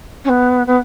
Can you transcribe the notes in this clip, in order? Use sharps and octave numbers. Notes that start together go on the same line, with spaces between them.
C#4
B3
B3